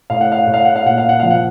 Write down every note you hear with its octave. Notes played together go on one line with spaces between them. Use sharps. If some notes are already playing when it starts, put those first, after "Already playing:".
A2 F5
F#5
F5
A2 F#5
F5
F#5
F5
A#2 F#5
F5
F#5
F3 F5
F#5